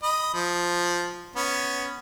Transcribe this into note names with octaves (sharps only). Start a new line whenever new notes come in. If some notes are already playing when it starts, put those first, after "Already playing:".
D#5 B5
F3
B3 C#4